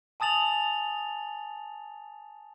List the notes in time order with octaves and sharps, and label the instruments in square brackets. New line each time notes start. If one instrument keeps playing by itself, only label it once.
[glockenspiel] G#5 A5 D#6 A6 F7 F#7